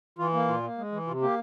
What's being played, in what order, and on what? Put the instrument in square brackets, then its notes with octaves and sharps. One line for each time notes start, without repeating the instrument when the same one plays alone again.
[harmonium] E3 F4
A#3
A#2 F4
A#3
G#3
E3
C3 F4
A#3 G4